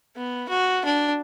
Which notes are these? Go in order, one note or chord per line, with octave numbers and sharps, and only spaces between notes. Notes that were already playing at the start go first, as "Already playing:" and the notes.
B3
F#4
D4